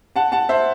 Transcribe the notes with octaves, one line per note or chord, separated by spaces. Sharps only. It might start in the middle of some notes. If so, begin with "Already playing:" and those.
F#5 A5
F#5 A5
C5 E5